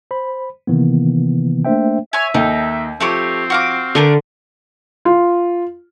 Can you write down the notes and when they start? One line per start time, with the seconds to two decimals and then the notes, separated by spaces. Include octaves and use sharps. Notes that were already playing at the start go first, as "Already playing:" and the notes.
0.11 C5 B5
0.67 C3 D#3 E3 A#3 B3
1.65 A3 A#3 D4 C5 E5 G5
2.13 C#5 E5 G#5
2.34 D#2 D#4 A4 G5
3.00 F3 A3 C4 G4 C#5
3.50 F#4 F5 D6
3.95 D3 A3 D4 A#4
5.05 F4